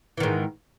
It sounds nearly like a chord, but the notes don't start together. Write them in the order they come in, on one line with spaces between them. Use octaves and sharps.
E3 D#3 G#2